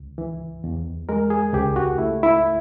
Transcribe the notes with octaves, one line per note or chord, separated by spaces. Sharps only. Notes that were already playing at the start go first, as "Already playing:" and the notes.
Already playing: C#2
E3
E2
G#3 A#4
G#4
C#2 G4
F#4
A3 E4
E4